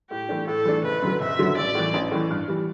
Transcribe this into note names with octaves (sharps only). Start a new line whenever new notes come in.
A2 G4
E3 A3 D4
A2 A4
E3 A3 D4
F#1 B4
F#2 D3 F#3
F#1 E5
F#2 D3 F#3
A1 D5
A2 E3
A1
A2 E3
G2
E3 G3